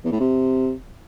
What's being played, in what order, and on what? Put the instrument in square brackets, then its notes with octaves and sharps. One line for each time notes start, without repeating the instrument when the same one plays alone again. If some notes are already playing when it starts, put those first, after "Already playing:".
[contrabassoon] E2
A2
C3